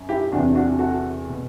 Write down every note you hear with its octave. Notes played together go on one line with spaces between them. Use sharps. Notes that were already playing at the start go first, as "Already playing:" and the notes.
Already playing: F#2
E4 G4
E2 C3 E3 D4 F#4
D4 F#4
F#4 A4
B2